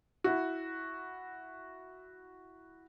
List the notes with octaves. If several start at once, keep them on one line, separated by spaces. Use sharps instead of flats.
E4 F#4